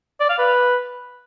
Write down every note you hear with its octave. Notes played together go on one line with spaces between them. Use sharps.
D5
F5
B4